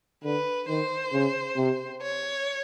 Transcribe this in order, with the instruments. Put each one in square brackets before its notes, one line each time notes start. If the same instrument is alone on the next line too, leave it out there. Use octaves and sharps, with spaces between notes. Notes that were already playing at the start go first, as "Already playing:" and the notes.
[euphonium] D3 [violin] B4
[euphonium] D#3 [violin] C5
[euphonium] C#3
C3
[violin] C#5